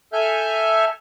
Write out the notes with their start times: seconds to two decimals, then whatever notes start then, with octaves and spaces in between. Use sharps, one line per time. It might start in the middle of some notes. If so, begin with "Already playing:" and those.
0.13 A4 E5 G#5 F6 G6